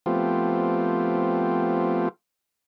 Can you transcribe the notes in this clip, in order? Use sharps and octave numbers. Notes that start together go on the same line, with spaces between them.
F3 A3 B3 C4 F4 G4